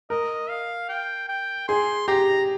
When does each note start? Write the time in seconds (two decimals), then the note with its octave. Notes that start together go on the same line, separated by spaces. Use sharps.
0.10 A#4 D#5
0.50 F5
0.89 G5
1.29 G5
1.68 G#4 C6
2.08 G4 A#5